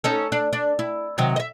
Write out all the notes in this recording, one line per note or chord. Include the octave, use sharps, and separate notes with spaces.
C#4 D#4 A4
D4
D4
E4
C3 D#3 F#3
D#5 E5